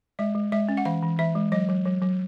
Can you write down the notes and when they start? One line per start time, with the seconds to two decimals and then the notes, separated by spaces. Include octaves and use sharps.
0.19 G#3 E5
0.35 G#3
0.52 G#3 E5
0.69 C#4
0.77 F#5
0.85 E3 F5
1.02 E3
1.19 E3 E5
1.35 G#3
1.52 F#3 D#5
1.69 F#3
1.85 F#3
2.02 F#3